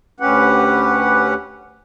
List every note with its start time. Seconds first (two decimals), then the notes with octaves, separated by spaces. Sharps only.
0.20 D2 C#4 G4 B4 F#5